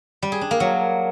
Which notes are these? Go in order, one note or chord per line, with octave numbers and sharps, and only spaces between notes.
G3
G#4
D4
A#3
F#3